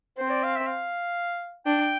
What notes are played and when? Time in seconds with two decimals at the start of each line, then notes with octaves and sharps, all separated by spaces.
0.18 C4 C5
0.30 D5
0.43 F5
0.56 E5
0.67 F5
1.66 D4 G5